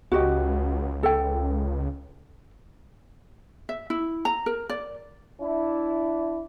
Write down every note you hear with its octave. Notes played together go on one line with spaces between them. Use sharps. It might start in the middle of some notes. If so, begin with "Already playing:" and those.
C#2 F#4 G4 D#5
A4 G5
E5
E4
A#5
A#4
D5
D4 E4